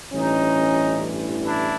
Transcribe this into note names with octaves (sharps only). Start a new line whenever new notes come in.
A1 G2 E3 C#4 D#4
D4 E4